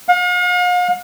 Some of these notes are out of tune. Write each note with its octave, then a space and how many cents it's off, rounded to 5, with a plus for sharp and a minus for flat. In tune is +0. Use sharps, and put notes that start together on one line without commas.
F5 +45